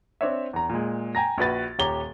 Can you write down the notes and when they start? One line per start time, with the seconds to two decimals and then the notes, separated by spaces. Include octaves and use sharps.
0.21 C4 D4 C#5 E5
0.53 E2 A#5
0.70 A#2 G#3
1.15 G5 G#5 A#5 A#6
1.38 A#1 F#4 B4 A6
1.79 D#1 G4 C#5 A#5 G7